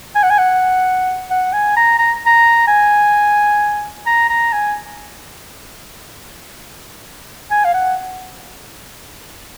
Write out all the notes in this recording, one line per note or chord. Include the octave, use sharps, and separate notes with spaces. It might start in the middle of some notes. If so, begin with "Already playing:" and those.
G#5
F#5
G#5
F#5
F#5
G#5
A#5
A#5
A#5
G#5
A#5
A#5
G#5
G#5
F5
F#5